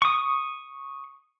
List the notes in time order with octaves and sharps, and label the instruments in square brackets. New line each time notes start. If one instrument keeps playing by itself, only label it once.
[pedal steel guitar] C#6 D#6